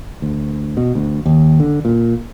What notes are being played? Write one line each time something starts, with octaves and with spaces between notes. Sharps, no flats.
D2
B2
D2
D#2
D3
A#2